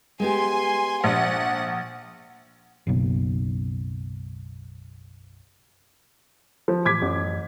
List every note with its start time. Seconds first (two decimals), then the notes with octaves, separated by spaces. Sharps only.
0.20 G#3 B3 G4 G#5 C6
1.04 A#1 F#5
2.87 F#1 B1
6.68 F3
6.85 A2 E3 D6 G#6 B6
7.02 A1 F#2